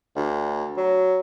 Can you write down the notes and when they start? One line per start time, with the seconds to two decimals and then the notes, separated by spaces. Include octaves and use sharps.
0.16 D2
0.77 F#3